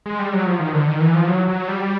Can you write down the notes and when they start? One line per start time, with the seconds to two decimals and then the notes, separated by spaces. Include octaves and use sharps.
0.06 G#3
0.19 G3
0.33 F#3
0.46 F3
0.60 D#3
0.73 D3
0.87 D#3
1.00 E3
1.14 F3
1.27 F#3
1.48 F#3
1.68 G3